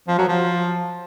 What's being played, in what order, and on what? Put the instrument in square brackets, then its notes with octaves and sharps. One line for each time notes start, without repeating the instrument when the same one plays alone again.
[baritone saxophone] F3
F#3
F3